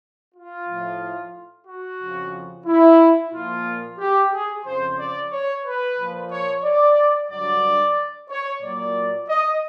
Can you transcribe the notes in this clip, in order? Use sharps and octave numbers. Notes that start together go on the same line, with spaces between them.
F4
A2 F3
F#4
F2 C#3 F3
E4
A#2 F3 F4
G4
G#4
F2 C#3 F3 C5
D5
C#5
B4
A#2 F3
C#5
D5
G2 D3 F#3 D5
C#5
A#2 F#3 D5
D#5